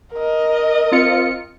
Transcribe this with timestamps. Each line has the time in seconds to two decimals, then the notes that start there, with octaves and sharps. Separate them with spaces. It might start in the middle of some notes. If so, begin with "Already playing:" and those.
0.13 A#4 D#5
0.92 C4 F4 C#7